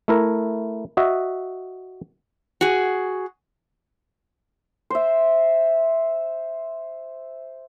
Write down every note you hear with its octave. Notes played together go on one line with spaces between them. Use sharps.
A3 E4 A#4
F#4 D#5 E5
F#4 G#4
C5 E5